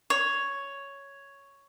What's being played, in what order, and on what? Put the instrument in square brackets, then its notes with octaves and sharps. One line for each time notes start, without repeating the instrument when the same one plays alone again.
[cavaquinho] C#5